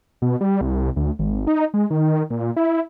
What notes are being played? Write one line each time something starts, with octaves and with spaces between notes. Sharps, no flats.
B2
G3
C2
D2
G#1
D#4
G#3
D#3
A#2
E4